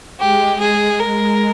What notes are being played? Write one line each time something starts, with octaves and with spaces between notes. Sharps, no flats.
G#3 G4
G#4
A#4